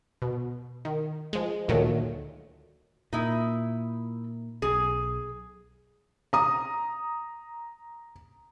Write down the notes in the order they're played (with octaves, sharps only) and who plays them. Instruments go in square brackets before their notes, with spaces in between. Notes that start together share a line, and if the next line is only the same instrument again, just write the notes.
[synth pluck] B2
D#3
F3 G#3
D2 A#2 D#3 F#3 A3
[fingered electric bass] A#2 [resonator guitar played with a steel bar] D#4 E4
[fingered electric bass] B1 [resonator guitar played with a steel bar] G#4
[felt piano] A#5 D#6